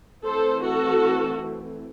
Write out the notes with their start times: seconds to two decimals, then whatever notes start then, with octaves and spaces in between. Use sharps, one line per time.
0.25 E3 A3 C4 A4 C5
0.63 F#4 A4